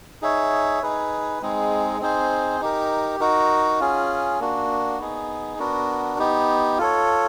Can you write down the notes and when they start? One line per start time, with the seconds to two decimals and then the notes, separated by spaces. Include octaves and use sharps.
0.22 D#4 G#4 C#5 E5
0.82 D#4 G#4 B4
1.42 G#3 C4 D#4 G#4
2.01 C4 D#4 G#4 C5
2.61 D#4 G4 A#4
3.20 D#4 F#4 A#4
3.80 C#4 F4 G#4
4.40 A#3 D4 F#4
4.99 B3 D#4 G#4
5.59 B3 D4 F#4 A#4
6.19 B3 D#4 G4
6.78 F4 A4 C#5